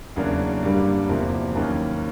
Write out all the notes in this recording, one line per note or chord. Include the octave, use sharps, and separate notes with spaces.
E2 C#3 F#3 A#3 D4
G2 D3 G3 A#3
E2 C3 F3 A#3
D#2 D#3 F#3 A#3 C#4